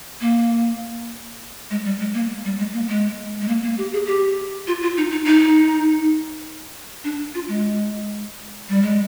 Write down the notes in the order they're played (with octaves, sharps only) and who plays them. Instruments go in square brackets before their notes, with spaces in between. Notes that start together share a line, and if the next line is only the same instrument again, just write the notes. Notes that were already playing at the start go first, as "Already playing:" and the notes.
[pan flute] A#3
G#3
G3
G#3
A#3
G3
G#3
A#3
G#3
G#3
A#3
A#3
G4
G#4
G4
F4
F4
D#4
D#4
D#4
D4
F4
G#3
G3
G#3